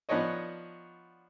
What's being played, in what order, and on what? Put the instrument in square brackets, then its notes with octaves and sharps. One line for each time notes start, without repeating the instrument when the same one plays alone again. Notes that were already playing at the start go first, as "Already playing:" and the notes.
[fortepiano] F3 B3 D4 D#4 C#5 D#5